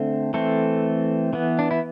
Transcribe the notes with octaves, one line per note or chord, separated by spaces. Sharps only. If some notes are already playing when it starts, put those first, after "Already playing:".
Already playing: D3 A3 C4
E3 A3 C4 A4
E3 B3
D4
E4